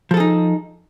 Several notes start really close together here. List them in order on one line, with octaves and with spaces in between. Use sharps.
F3 A4 G#4 D#4